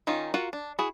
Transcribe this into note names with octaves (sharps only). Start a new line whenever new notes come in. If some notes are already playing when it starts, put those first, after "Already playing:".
D#3 C#4 D#4 F4
F4 F#4 A#4 F#5
D4
E4 F#4 G#4